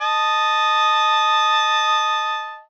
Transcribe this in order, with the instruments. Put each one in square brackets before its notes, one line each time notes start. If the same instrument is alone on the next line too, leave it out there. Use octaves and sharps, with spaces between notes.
[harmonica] D#5 A5